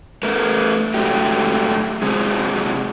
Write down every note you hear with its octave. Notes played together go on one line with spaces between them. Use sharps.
A3 A#4 B4
G#2 F#3 A3 G4
C3 F#3 G#3 C4 G#4